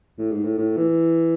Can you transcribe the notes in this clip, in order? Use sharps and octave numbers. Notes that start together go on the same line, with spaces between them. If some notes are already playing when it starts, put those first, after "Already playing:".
A2
G#2
A2
A2
E3